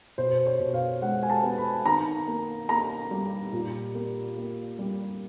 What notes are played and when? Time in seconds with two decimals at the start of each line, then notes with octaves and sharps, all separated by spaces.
0.18 B2 C5
0.46 C#5
0.60 B2
0.74 F5
1.02 G#3 F#5
1.23 G#5
1.30 A5
1.43 B3
1.58 B5
1.86 D#3 A#5
2.28 A#3
2.69 A#3 A#5
3.11 G3
3.53 A#2
3.95 A#3
4.37 A#3
4.79 G3